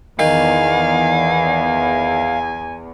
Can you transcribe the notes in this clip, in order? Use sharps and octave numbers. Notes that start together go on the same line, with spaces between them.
E2 D#3 F5 G#5